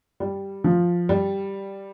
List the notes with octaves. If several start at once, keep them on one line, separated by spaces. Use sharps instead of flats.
G3
F3
G3